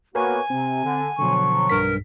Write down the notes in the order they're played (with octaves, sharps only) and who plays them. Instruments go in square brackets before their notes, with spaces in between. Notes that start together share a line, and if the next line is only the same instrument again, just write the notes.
[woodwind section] A#3 B3 F#4 [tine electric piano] A#4 B4 C#5 [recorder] G#5
[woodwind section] C3 [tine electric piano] C4
[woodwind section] D3
[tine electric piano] B2 D3 [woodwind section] F3 F#3 [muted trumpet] C#6
[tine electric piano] B1 G2 B6 [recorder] A#4